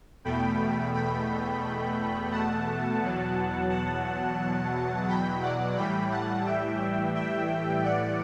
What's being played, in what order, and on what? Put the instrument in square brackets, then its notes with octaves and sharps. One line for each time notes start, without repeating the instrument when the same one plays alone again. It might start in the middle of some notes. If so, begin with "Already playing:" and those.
[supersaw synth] E2 B2 A3 G5 B5
G5 B5
F#5 A5
E2 B2 F#3
F#5 A5
G5 B5
D5 F#5
A2 E3 G3 G5 B5
F#5 A5
E5 G5
E5 G5
D5 F#5